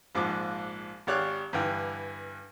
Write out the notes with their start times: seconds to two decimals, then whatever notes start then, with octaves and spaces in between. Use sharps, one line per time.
0.15 A#1 G#2 F3 D6
1.07 G#1 G4 C#5 D5 F5 F#6
1.53 G2 D3 E3 G5